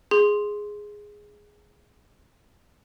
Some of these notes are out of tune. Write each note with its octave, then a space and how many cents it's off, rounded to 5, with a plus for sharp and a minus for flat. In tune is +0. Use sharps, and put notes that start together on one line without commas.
G#4 +0 C6 +0